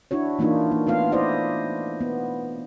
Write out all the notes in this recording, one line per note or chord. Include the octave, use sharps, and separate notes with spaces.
D4 E4 F#4 C#5
E3 A#3 D4 D#4 F4
A#3
A3 B3 F4 F5
E4 C5 D5 D#5 F5
B3